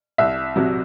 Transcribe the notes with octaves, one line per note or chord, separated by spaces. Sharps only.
C2 E5
C3 F#3